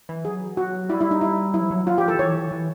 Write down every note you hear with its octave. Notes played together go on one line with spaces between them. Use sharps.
E3
F#3 G#4
F#4
G3 E4
E4
D#4
E4
F#3 E4
F3
F#3
F#3 F4
F3 G4
E3 A4
E3 C#5
E3